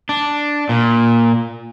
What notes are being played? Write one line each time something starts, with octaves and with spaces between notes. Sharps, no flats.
D4
A#2